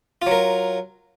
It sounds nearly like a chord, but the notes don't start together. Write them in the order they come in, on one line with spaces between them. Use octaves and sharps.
F4 F#3 A#4